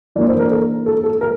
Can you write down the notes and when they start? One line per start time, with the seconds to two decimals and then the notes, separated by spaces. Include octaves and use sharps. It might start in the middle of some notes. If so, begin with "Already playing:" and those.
0.15 E3 A#3 D4 D5
0.28 C5
0.39 A#4
0.51 A4
0.86 A4
1.03 A4
1.21 A#4